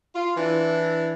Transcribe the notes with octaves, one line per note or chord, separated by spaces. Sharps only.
F4
E3 D4 E4